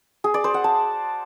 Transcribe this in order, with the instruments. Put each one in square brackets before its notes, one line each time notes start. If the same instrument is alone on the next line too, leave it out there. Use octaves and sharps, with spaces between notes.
[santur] G#4
D5
C5
F#5
A5